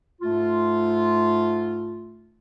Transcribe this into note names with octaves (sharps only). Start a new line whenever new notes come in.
G#2 A3 F4